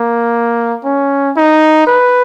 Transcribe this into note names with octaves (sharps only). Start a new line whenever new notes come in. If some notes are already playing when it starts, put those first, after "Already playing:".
Already playing: A#3
C#4
D#4
B4